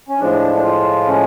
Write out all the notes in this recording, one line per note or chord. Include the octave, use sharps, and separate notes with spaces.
C#4
A2 F3 G#3 D4
D4
F4
C#4